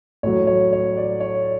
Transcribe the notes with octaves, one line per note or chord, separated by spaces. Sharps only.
A2 F#3 C#5
C#5
C#5
D5
C#5